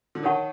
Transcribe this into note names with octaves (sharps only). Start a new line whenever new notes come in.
D3
D#3 A#4 C#5 F#5 A5 C#6